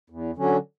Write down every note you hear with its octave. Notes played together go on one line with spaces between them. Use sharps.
E2
D3 F#3 C#4